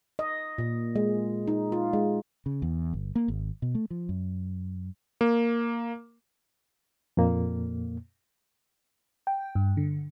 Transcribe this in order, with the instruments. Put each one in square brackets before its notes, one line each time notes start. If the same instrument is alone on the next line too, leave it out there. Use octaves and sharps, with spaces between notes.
[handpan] D#5
A#2
G#3
D#4
F4
G#3
[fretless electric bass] C#3
E2
G1
A#3
G#1
B2
A3
F3
F#2
[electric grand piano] A#3
[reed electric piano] F2 A#2 A#3
[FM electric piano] G5
G2
D3